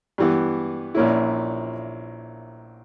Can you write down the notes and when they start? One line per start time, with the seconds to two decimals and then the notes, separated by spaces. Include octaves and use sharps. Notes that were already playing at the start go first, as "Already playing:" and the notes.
0.18 G2 E3 B3
0.95 A#1 A#2 A#3 C#4 E4